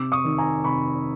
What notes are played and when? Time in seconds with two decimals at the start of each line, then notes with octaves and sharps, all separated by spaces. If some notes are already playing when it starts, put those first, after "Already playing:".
Already playing: C3 D6 E6
0.12 C#6 D#6
0.24 D#3
0.38 G#5 A#5
0.64 C3 B5 C#6